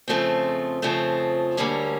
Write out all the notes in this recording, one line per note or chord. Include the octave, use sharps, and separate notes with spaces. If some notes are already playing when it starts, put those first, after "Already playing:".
F2 C#3 F3 A3 C4
F2 C#3 F3 A3 C4
D2 D3 G3 A#3 C#4